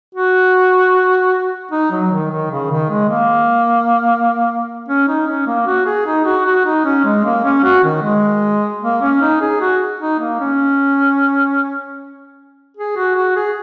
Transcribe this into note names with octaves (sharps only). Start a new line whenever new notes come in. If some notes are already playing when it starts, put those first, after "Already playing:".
F#4
D#4
F#3
D#3
D#3
C#3
D#3
G#3
A#3
C#4
D#4
C#4
A#3
F#4
G#4
D#4
F#4
F#4
D#4
C#4
G#3
A#3
C#4
F#4
D#3
G#3
A#3
C#4
D#4
G#4
F#4
D#4
A#3
C#4
G#4
F#4
F#4
G#4